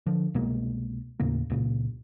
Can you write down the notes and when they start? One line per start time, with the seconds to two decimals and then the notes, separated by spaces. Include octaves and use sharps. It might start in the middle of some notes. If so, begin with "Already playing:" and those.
0.06 D3 F3
0.34 C2 B2 G#3 A#3
1.20 D#2 A2 C#3 A#3
1.50 C#2 A#2 C#3